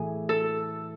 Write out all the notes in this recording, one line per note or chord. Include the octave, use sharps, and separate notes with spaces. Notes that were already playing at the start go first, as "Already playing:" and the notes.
Already playing: A2 E3 G#4
A4